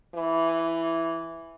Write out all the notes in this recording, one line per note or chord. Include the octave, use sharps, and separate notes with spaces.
E3